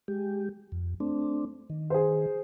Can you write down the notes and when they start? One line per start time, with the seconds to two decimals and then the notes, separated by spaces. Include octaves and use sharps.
0.08 G#3 G4
0.72 F2
1.00 A3 C4 D4
1.70 D#3
1.90 G#4 C5